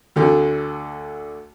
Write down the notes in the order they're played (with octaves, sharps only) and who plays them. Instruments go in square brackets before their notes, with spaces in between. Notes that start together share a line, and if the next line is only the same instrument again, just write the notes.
[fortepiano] D2 D3